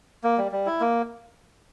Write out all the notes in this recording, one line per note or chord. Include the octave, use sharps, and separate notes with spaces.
A#3
G3
G3
E4
A#3